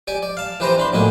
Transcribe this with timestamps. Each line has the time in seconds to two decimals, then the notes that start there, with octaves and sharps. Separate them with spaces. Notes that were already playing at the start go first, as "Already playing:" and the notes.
0.07 G4 D5 G#5
0.23 D5
0.37 F5 A5
0.60 E3 G4 B4 C5 G5 A#5
0.78 D4 B5 C6
0.93 A2 F#3 A#3 D4 D#4 G#5